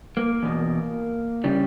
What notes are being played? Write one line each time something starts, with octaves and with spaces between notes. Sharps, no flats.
A#3
E2 B2
C#3 G3